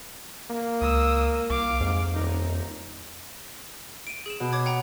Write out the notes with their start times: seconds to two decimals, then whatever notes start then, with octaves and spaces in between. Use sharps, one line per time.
0.50 A#3
0.81 C#2 D#6 E6
1.50 C2 F5 D6
1.80 F2 G#2
2.14 D#1 D#4
4.07 D7 D#7
4.26 G#4 E7
4.40 B2
4.53 C#5 D6 G#6
4.66 F#5 G5 A#5